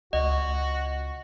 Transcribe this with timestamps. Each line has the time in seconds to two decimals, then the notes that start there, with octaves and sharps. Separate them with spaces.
0.13 C#2 F#4 D#5